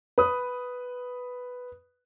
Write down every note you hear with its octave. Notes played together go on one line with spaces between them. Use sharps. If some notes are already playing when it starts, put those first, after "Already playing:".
B4 D#6